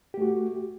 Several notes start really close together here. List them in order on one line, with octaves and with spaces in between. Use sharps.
G4 A3 F#4